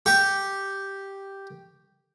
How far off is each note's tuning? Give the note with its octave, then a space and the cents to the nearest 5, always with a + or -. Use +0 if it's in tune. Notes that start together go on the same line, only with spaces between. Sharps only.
G4 +0 C#6 +0